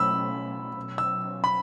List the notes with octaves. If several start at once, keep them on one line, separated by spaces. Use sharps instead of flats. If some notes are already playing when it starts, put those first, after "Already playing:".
Already playing: B2 F#3 A3 C#4 B5 E6
B2 F#3 C#4
E6
B5